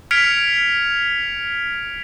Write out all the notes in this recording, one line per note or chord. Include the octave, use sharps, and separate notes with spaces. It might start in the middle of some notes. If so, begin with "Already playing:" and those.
F6 G#6 B6 C#7 D7 F7